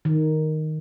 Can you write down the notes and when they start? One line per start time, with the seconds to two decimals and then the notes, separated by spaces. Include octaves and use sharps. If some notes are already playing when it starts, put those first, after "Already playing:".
0.05 D#3